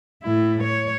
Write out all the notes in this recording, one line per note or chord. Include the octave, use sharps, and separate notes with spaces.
A2 E4
C#5